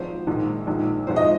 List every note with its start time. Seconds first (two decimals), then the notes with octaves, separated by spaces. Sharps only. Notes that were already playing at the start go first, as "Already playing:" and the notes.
Already playing: G#1 G#2 F3 C5
0.27 A#1 G#2 D#3
0.67 A#1 G#2 D#3
1.07 G#1 G#2 F3 C5
1.16 D#5